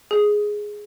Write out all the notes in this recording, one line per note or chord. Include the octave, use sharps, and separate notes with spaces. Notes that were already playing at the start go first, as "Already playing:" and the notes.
G#4